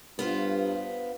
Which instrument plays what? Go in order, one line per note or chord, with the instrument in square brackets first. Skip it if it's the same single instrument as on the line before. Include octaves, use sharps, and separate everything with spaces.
[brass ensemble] G2 [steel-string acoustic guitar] B3 F4 C5